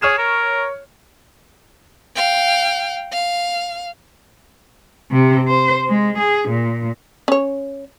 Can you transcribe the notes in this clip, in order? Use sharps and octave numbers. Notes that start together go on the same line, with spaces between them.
G#4 C#5 F6 E7
A#4
F5 G5
F5
C3
C5
G#3
G#4
A#2
C#4 C#5